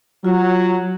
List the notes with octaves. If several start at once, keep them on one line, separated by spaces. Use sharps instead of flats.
F#3 F4 F#4